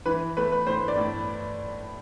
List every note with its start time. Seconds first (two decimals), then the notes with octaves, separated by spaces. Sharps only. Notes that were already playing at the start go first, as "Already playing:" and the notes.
0.06 E3 B4
0.37 A3 B4
0.52 B4
0.67 A2 C5
0.88 D5
0.97 A2